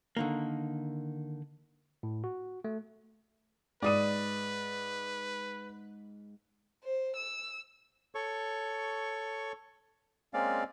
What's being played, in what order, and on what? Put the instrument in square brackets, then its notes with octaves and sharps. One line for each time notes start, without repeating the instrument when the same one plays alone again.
[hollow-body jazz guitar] D3 D#3 A#3
[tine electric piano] A2
F#4
A3
[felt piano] G#2 D#6 D#7 [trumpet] B4 [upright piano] D5
[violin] C5
E6
[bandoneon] A4 C#5 C#6
G#3 A#3 C4 C#4 D5 F5